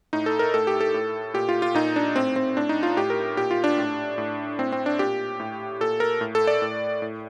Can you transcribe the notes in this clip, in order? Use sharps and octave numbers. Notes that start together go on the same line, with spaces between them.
A2 D#4
A4
A#4
A2 A4
G4
A4
A2
A#2 G4
F4
F4
A#2 D#4
D4
A2 C4
C4
A2 D4
D#4
F4
A2 G4
A#4
A#2 G4
F4
D4
A2
A2
A2 C4
C4
D4
A#2 G4
A2
A#2 A4
A#4
A2
A4
D5
A2
A2